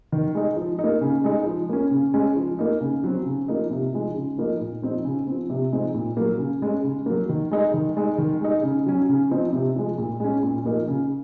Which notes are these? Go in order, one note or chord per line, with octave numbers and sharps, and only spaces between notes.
D#3
G#3 D#4
F3
D#4
A#3
C#3
G#3 D#4
F3
A#3 C#4
C#3
G#3 C#4
F3
A#3 D#4
C#3
F#3 C4
C#3
F3 A#3 D#4
C3
F3 G#3 D#4
C#3
F3 A#3 D#4
A#2
F3 C4 D#4
C#3
F3 C4
C3
F3 G#3 C4 D#4
A#2
F#3 A#3
C#3
G#3 C#4
C#3
F#3 A#3
D#3
G#3 D#4
D#3
G#3 D#4
D#3
G#3 D#4
C#3
F#3 C#4
C#3
F3 C4 D#4
C3
F3 G#3
A#2
G#3 C#4
A#2
F3 A#3 D#4
C#3